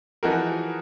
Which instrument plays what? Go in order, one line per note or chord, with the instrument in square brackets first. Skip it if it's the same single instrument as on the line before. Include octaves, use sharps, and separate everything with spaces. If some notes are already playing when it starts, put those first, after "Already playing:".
[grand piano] E3 F3 D#4 F#4 G#4 A#4